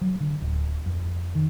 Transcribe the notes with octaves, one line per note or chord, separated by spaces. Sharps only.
F#3
D3
D1
F2
D#3